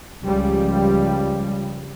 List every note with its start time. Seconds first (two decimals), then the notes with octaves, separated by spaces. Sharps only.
0.23 C#2 F3 G3